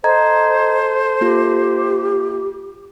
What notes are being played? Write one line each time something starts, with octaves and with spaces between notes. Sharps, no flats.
A4 C5 D#5 A#5 G#6
A#3 F4 G4